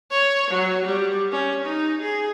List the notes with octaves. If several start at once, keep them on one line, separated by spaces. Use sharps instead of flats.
C#5
F#3
G3
C#4
D#4
G#4